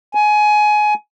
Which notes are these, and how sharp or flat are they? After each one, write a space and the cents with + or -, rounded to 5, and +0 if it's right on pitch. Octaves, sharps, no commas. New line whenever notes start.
G#5 +20